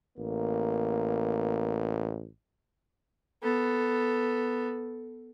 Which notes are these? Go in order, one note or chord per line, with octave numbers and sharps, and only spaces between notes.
A1 A#3
B3 A4